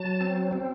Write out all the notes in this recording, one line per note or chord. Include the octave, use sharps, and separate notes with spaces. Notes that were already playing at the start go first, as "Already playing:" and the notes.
Already playing: F#3 A5
C4
C4